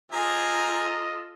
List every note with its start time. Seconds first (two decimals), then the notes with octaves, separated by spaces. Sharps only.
0.12 C4 F4 G#4 A4 D#5 G#5 A#5